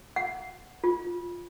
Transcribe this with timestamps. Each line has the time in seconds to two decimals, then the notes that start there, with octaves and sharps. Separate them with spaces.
0.16 F#5
0.84 F4